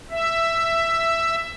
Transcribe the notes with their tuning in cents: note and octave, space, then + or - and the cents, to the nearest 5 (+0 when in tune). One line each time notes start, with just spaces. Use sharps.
E5 +5